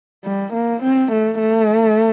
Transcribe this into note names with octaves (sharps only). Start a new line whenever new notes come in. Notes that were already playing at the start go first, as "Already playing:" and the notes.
G3
A#3
C4
A3
A3